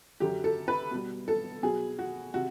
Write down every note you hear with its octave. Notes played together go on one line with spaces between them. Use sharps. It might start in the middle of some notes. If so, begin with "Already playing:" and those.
F#2 D3 F#3 G4
A4
B4
B2 G3
A4
B2 F#3 G#4
F#4
C3 F#4